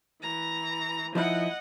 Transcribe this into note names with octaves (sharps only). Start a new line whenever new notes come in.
E3 A#5
F3 D#4 E4 D#5 F#5